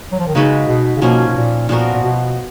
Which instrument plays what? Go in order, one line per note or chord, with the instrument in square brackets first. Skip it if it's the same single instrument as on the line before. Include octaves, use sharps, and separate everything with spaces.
[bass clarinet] F#3
F3
D#3
[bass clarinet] C#3 [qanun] G#3 D#4 F#4 B4
[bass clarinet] B2
C#3
[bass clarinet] B2 [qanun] F3 A#3 C#4
[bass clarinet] B2
A#2
[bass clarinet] A#2 [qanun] F3 B3 F#4 A#4
[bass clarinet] A#2
B2